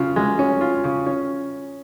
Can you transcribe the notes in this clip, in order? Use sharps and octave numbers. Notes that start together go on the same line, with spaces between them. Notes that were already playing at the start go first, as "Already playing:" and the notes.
Already playing: C#3 F4
G#3
C#4
F4
C#3
C#4